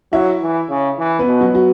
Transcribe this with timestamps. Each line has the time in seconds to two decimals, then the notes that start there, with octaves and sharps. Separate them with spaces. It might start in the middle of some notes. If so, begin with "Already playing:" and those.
0.12 F#3 E4 E5
0.41 E3
0.69 C#3
0.99 E3
1.19 B3 B4
1.27 B2
1.41 F#3 F#4
1.55 F#4